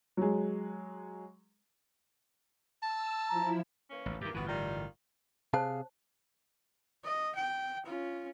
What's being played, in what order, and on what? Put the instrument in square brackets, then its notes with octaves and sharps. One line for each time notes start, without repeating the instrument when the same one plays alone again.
[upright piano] F#3 G#3
[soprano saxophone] A5 [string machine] E6
[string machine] F3 E4 [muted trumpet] A#5
[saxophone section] E3 A#3 C#4
[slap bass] A1 D2
[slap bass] G2 D#3 [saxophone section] A#2 E3 G4
[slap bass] G1 A2 E3 [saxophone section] B3 F#4
[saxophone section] D#3 G3 F4
[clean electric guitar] C3 G#4 F5 [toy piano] C5 C#5 A5
[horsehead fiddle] D#5
G5
C#4 F4